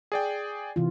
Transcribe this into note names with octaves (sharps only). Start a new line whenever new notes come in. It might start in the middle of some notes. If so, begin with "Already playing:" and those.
G#4 D5 G5
C3 E3 F4